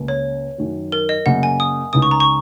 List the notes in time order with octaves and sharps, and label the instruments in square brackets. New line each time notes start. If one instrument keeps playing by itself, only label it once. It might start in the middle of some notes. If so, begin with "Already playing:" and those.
Already playing: [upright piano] C#2 C#3 A#3
[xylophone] C#5
[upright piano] F#2 D#3 F#3
[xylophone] A#4
D#5
[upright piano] F#2 C#3 A#3 [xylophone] F#5
[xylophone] G#5
D#6
[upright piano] C#2 C#3 G#3 D#4 [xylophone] D#6
[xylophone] C#6
A#5
C#6